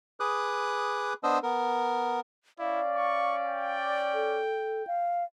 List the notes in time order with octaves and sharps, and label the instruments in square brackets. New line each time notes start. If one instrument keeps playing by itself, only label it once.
[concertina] G#4 B4 D6 D#6 F#6
B3 D4 C5 D#5 E6
B3 A#4
[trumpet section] C#4 D5 [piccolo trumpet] E4 [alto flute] F5
[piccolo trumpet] C#6
G5
[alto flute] A4
F5